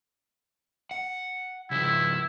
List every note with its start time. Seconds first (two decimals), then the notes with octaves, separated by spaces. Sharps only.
0.91 F#5
1.71 C#3 F3 E4